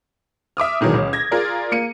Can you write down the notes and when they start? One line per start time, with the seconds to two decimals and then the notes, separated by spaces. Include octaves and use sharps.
0.57 E5 D6 D#6 F6
0.81 B2 D#3 E3 F#3 G#3
0.94 C#2 C#4
1.13 G#6 A#6
1.31 F4 G#4 A#4 D5
1.72 A#3 C#7 D#7